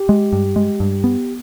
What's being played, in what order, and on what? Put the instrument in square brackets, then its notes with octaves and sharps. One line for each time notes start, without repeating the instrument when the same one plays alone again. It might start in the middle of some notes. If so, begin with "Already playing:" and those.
Already playing: [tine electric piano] G4
[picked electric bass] G#3
G2
G#3
G2
B3